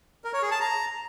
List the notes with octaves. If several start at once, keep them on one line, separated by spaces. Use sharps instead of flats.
A#4
C#5
G#4
A5
A#5